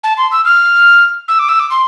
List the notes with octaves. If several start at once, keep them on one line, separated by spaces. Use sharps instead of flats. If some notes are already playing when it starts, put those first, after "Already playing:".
A5
C6
E6
F6
E6
D6
E6
D6
C6